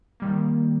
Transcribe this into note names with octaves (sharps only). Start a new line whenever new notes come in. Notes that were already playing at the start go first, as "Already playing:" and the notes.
D#3 G3 A#3